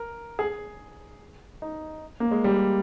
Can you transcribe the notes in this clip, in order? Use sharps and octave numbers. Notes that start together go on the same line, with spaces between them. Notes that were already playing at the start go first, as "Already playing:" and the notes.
Already playing: A#4
G#4
D#4
A#3
G#3
G3